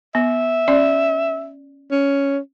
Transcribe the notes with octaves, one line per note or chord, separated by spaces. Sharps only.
B3 E5
C#4 D5
C#4